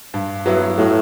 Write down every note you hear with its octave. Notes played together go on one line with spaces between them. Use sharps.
G2
F#3 B3 E4
A2 F#3